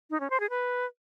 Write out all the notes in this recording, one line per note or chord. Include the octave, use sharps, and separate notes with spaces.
D#4
C#4
C5
G#4
B4